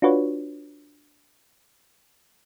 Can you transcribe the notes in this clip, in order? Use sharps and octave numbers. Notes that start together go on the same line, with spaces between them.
D4 F4 F#4 B4 C#5